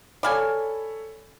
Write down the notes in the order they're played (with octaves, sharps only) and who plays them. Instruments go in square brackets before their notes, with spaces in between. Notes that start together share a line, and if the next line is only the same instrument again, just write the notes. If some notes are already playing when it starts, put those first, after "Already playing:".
[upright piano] A4 C#5 B5 [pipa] D5 F5 G#5